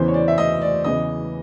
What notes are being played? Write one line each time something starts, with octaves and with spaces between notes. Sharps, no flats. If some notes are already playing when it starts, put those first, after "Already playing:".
Already playing: E2 C#3 E3 C5
C#5
D5
E5
D#5
D5
E2 C#3 E3 D#5